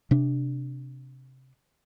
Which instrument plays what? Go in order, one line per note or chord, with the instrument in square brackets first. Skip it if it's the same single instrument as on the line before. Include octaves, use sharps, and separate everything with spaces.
[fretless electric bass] C3 D4